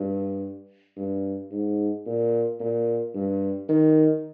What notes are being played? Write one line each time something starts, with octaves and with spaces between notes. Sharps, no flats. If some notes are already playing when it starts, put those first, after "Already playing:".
Already playing: G2
G2
G#2
A#2
A#2
G2
D#3